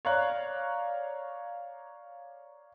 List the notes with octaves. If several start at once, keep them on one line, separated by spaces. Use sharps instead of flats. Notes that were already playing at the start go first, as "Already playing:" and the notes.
C#5 D5 F5 A#5 F#6